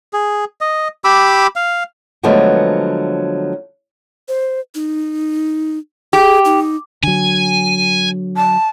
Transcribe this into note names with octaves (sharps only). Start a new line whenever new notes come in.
G#4
D#5
G4 B5 D6 E6
F5
D3 F3 F#3 G#3 A3 B3
C5
D#4
G4 G#4
D#4
D3 F#3 G#5
A5